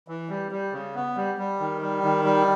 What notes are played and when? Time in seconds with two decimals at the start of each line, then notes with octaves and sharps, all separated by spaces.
0.08 E3
0.29 G3
0.51 G3
0.73 C#3
0.95 B3
1.16 G3
1.38 G3
1.60 D#3
1.82 G3
2.03 D#3
2.25 G3